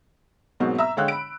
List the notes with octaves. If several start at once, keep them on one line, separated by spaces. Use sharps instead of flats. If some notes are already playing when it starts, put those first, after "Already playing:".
G#2 B2 F#3 A#3 C4 D#4
E5 A#5 E6
D3 G#3 C#5 F5 G5 F#6
B5 D7